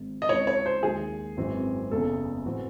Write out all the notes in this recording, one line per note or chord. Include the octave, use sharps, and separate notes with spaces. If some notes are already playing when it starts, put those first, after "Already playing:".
Already playing: G#1 G#2 D#3
D#5
C#2 C#3 G#3 C4 E4 C#5
C#5
C5
D#2 D#3 G#3 G#4
G#1 F#2 E3 G#3 C4
F#1 E2 C#3 A4
A2 E3 C4 F#4